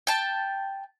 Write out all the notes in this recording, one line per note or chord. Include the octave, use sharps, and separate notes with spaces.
G5 A5